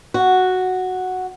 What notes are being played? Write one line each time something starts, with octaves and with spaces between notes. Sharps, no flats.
F#4